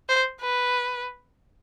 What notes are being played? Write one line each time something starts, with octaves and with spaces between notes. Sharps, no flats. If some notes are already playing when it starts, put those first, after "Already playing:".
C5
B4